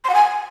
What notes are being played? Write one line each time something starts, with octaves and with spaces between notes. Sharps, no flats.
C6
F#5
G#5